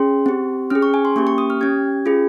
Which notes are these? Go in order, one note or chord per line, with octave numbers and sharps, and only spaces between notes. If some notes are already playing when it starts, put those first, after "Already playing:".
Already playing: C#4 G#4 C6
C4 G4
C#4 G#4 F6
C#6
G#5
C6
A#3 C#4 G4 C#6
C#6
D#6
F6
C#4 G4 G#6
C#4 F4 G#4